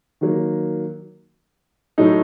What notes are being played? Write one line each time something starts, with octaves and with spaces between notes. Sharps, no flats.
D#3 F#3 A#3
A2 F#3 A3 D#4